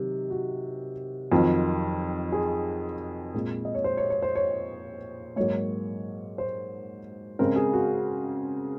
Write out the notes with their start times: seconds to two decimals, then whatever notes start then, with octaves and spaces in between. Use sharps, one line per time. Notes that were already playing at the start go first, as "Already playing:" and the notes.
Already playing: C3 D#3 F#3
0.30 F#4
1.32 F2 D#3 F#3 C4 F4
2.32 G#4
3.34 A#2 G#3 C4
3.65 D#5
3.75 C#5
3.84 C5
3.97 C#5
4.10 C#5
4.22 C5
4.35 C#5
5.36 G#2 F#3 A#3 C#5
6.38 C5
7.39 C#3 G#3 C4 A#4
7.56 G#4
7.73 F#4